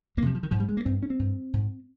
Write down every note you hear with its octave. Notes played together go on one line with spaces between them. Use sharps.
F2 A#3
C3 F3
F3
D#3
G#2 F3
G3
G#3
A#3
G2 C4
C#4
C4
G2
G#2